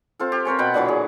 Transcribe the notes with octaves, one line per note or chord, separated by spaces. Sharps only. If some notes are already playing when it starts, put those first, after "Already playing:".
C4 F4 A4
G4
C4 A#4 C#5 G#5
B2 F#5 G5 B5
A#2 D3 E3 F#3
G#4